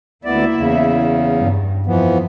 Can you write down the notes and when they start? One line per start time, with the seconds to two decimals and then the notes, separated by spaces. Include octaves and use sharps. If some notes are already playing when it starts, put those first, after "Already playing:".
0.25 D2 A#3 B3 E4 D5 E5
0.55 E2 C#3
1.39 G2
1.86 F2 E3 F3 B3